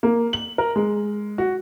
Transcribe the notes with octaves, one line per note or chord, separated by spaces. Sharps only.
A#3
F#7
A#4
G#3
F#4